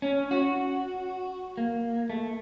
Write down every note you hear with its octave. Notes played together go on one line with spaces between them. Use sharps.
C#4
F#4
A#3
A3